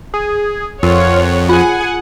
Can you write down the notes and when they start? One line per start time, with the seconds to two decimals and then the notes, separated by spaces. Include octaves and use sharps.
0.14 G#4
0.83 F2 F4 A#4 C#5 F#5
1.49 F4 G#4 F#5 G#5